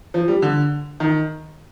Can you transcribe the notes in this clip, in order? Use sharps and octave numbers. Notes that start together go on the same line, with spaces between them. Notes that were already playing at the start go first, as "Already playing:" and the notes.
F3
G3
D3
D#3